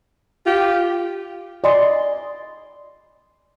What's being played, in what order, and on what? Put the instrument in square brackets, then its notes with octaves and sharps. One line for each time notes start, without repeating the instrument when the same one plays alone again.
[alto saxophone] F4 [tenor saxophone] G4
[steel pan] D5 D#5 G#5 B5 C6